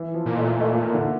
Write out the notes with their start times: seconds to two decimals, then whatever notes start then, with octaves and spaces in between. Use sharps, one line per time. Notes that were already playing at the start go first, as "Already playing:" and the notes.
Already playing: E3
0.14 F3
0.26 A#2
0.37 A3
0.60 A3
0.82 A#3
0.94 D3